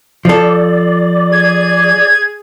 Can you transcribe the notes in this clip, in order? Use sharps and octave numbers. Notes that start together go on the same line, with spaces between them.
F3 A4 D5
G#4 G#6